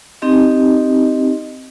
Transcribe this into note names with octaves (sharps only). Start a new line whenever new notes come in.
C4 D#4 G4 D#5